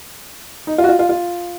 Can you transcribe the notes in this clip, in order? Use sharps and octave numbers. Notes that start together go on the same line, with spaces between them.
D#4
F4
F#4
F4
F4
F4